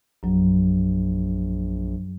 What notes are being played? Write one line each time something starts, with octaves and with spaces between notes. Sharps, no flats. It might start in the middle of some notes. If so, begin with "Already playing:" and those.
A#1 F#2 F#3